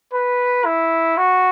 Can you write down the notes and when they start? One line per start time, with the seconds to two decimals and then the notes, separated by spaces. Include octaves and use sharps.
0.13 B4
0.65 E4
1.17 F#4